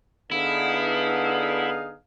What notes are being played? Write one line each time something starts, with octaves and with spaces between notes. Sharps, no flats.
D3 B3 D#4 E4 G#4 F5